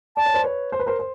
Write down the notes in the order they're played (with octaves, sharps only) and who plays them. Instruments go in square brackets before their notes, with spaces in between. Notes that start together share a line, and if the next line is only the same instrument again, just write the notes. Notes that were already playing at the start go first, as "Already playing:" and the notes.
[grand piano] D5 [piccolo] A5
[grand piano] C#5
C5 D5
B4 C#5
C5
B4
A#4 C5
C5